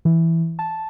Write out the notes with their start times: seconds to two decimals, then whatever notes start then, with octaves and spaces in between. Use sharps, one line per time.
0.05 E3
0.59 A5